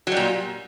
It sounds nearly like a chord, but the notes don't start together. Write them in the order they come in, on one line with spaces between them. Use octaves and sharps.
F#3 G3 A#2